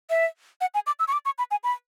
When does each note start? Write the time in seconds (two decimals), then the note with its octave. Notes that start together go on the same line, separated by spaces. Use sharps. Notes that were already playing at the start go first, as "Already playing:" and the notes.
0.10 E5
0.61 F#5
0.74 G#5
0.87 D6
0.99 E6
1.08 C#6
1.12 D6
1.25 C#6
1.38 B5
1.51 G#5
1.64 B5